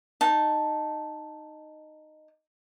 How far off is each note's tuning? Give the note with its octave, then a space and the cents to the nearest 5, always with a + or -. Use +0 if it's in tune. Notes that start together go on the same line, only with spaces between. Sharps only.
D#4 -10 A5 +0